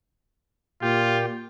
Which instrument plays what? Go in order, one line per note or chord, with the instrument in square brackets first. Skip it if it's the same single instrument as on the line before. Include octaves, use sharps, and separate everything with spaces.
[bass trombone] A#2 [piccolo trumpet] F4 [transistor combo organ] G4